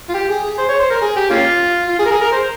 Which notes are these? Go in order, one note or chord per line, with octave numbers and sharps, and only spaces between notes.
F4
G4
G#4
G#4
C5
C#5
C5
A#4
G#4
G4
A#3 C#4 F4
F4
G#4
A#4
G#4
A#4
C5